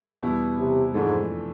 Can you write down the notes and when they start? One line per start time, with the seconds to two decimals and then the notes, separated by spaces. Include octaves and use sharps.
0.23 E2 B2 G3 B3 E4
0.59 C3
0.93 F2 G#2 C3 E3 A3 D4